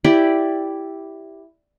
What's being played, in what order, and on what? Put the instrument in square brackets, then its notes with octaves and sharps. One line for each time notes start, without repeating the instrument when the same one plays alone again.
[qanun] E4 G4 D5